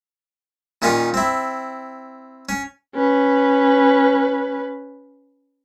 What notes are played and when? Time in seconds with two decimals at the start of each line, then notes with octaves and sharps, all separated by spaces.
0.82 A#2 D#3 C#4 D#4 F4
1.14 C4 E4
2.49 C#4
2.95 C#4 B4